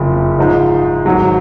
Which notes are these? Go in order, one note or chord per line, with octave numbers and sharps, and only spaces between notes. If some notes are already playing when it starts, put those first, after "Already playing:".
Already playing: F#1 F2 C#3 F3
G#2 F3 G#3 D#4
G#1 G#2 F#3